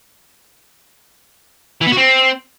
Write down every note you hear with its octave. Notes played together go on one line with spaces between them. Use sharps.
E3
B3
F#4
C4